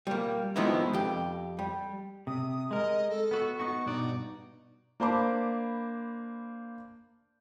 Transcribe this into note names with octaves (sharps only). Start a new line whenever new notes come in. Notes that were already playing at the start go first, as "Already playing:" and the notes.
G3 A#3
D#3 F3 G#3 B3 D#4 E4
F2 G4
G3
C3 D#6
G#3 A#4 D#5
A4
B3 F#4
B3 D#4 F#4 C#6
G2 B2 D#4 D5
A#3 D4 C5 A5 B5 D6